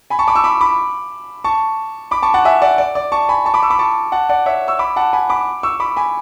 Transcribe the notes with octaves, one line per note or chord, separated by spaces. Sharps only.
G#5 B5
A5 C#6
B5 D6
C#6 E6
B5 D6
B5 D6
A5 C#6
B5 D6
A5 C#6
F#5 A5
E5 G#5
D5 F#5
D5
D5
A5 C#6
G#5 B5
A5 C#6
B5 D6
C#6 E6
B5 D6
A5 C#6
F#5 A5
D5 F#5
C#5 E5
C#6 E6
B5 D6
F#5 A5
G#5 B5
B5 D6
C#6 E6
B5 D6
G#5 B5